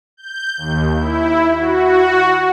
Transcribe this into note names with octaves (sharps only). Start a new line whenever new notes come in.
G6
D#2
E4
F#4